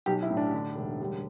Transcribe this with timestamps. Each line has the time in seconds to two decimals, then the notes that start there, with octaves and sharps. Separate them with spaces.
0.06 B1 G4
0.23 E4
0.30 A2
0.37 D4
0.53 D3
0.76 E1
1.01 G3